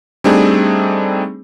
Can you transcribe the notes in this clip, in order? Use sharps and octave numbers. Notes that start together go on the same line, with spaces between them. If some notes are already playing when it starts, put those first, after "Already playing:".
G3 A3 C4 D4 D#4 G#4